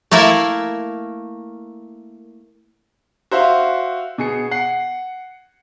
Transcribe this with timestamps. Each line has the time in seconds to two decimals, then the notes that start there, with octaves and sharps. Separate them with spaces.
0.11 A3 A#3 E4 A#4 E5
3.31 F#4 C5 E5 F5
4.18 B2 G#4 C#7
4.51 F#5 C7